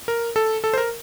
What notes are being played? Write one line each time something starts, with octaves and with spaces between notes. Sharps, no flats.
A#4
A4
A4
C5
A#4